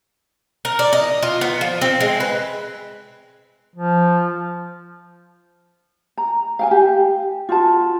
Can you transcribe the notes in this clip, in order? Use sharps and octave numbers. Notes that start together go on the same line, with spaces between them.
A#4
D5
D#5
F4
B3
F3
C4
G#3
B4
F3
A#5
F5 G5 G#5
G4
F4 F#4 A5